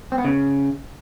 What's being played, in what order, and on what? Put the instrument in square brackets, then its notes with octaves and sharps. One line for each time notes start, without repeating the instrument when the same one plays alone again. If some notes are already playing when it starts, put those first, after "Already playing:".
[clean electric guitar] C4
B3
C#3